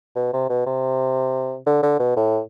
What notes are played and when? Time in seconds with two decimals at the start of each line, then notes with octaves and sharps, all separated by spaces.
0.16 B2
0.34 C3
0.50 B2
0.67 C3
1.67 D3
1.83 D3
2.00 B2
2.17 A2